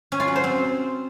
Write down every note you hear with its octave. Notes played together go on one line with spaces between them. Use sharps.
C#4
F4
F#3
C5
C4